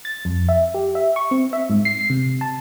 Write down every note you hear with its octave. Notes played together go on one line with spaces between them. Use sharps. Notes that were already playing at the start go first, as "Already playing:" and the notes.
A6
F2
E5
G4
E5
C#6
C4
E5
G#2
C7
C3
A5